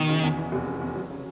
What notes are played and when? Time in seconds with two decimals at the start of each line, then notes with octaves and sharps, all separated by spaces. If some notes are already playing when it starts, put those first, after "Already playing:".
Already playing: B2 D#3
0.09 C#3
0.23 E2
0.38 E3
0.52 F1
0.67 C#3
0.81 E2
0.96 F#3
1.10 C#3